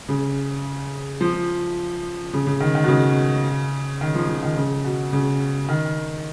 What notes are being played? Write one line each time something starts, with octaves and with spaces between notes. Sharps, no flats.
C#3
F3
C#3
C#3
D#3
D#3
B2
C#3
D#3
F3
F3
D#3
C#3
B2
C#3
D#3